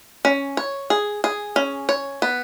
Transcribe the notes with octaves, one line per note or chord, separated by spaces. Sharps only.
C#4
C#5
G#4
G#4
C#4
C#5
B3